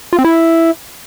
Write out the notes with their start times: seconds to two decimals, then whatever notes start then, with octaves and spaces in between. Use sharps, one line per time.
0.13 F4
0.19 C4
0.24 E4